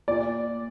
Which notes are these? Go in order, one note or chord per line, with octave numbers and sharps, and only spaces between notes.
A#2 D5